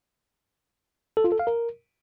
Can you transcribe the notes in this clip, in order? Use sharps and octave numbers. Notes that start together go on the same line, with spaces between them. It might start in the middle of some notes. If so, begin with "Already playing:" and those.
A4
F4
A4
F5
A#4